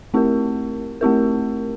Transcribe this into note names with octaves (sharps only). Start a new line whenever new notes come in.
A3 C4 E4 G4 A#4
A3 C4 E4 G4 A#4